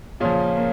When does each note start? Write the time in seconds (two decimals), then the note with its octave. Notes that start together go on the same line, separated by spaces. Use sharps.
0.20 A#2 C#3 F3 C#4
0.57 A#3